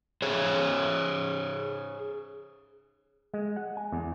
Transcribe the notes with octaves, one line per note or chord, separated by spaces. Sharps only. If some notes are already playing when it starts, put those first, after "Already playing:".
G#4 C5 C#5
G#3
F#5
G#5
E2